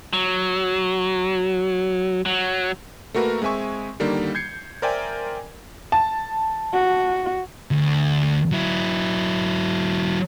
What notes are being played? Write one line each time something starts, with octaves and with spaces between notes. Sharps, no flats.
F#3
F#3
A3 A#3 F#4 A#4 B4
G#3 C4 E5 G#5 C#6
D3 D#3 G3 A#3 D#4
G6 G#6 C7 C#7
A#4 C5 D5 E5 G5 G#5
A5
F#4
D2
F#3 E4